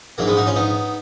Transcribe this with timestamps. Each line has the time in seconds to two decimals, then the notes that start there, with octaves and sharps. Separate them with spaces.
0.18 A#1 G#2 F3 F#3 A#3
0.27 G#3 B3
0.37 D#4 F#4
0.47 C#4 F4
0.56 B3 D#4